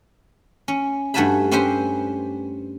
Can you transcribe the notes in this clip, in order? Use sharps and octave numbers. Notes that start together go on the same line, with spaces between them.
C#4
G2 A3 F#4 G#5 A5 B5
C4 C#4 G4 B4 C5 G5